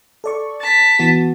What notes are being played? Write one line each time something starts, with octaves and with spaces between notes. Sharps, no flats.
A4 D5 C#6
A5 A6 B6
E3 B3 F#4